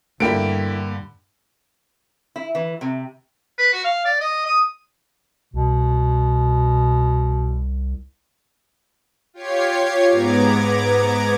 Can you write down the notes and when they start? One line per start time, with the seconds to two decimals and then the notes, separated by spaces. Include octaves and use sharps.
0.20 G2 D3 A#3 E4 G5 B5 D7
2.36 E4
2.55 E3
2.81 C3
3.58 B4
3.73 F#4
3.84 F5
4.05 D5
4.20 D#5
4.46 D#6
5.54 C2 B2
9.34 F4 G4 C#5 G#6 C7
10.11 G#2 B3 A#5 D6 G#6